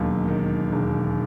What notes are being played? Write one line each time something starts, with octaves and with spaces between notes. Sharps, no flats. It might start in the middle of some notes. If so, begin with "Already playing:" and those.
Already playing: E1 D#2 F#3
D#3
E1